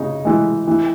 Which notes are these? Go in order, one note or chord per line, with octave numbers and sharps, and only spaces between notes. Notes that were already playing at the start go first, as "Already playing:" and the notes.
Already playing: C#3 D#4
E3 G#3
E3